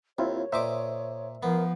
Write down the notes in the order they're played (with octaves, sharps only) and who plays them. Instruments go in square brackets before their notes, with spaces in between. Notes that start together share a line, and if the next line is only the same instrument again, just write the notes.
[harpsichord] D#2 [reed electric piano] C4 E4 F4 [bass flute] C#5
[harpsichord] A#2 D#5 D6 [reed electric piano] C5 E5
[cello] F3 [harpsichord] B3 [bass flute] A#4